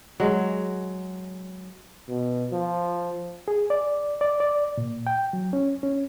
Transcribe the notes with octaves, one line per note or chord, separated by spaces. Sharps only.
F#3 G#3
B2
F3
G#4
D5
D5
D5
A#2
G5
F#3
C#4
C#4